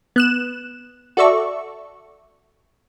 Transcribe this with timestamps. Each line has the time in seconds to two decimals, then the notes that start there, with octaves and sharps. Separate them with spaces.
0.16 B3 F#6 E7
1.17 F#4 A4 D5 E5 C#6